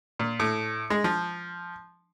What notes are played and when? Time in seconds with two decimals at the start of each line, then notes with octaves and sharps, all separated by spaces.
0.19 A#2
0.40 A2
0.90 G#3
1.04 F3